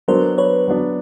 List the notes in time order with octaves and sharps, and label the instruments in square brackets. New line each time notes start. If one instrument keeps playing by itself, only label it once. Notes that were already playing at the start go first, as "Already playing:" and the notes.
[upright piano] F#3 B3 D4 [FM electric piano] A#4 C5
[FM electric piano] B4 C#5
[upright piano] F#3 B3 D4